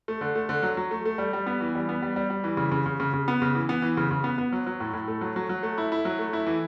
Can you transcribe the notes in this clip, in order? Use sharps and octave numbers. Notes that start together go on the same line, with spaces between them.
A3
D3
A3
D3
F#3
F#3
A3
A3
G3
G3
B3
E3
G3
B3
G3
G3
G3
E3
C#3
C#3
C#3
C#3
C#3
B3
C#3
E3
B3
E3
C#3
C#3
B3
B3
F#3
F#3
A2
A2
A3
F#3
F#3
F#3
A3
E4
E4
F#3
A3
E4
E3